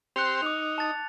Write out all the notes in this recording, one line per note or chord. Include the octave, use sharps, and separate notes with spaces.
C4 G4 C5 F#6 C#7 F7
D#4 D6 F7
A5 A6